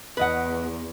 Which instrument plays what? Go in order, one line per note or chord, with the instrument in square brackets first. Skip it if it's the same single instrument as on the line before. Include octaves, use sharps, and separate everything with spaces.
[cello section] E2 [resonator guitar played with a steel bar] B4 D#5 F#5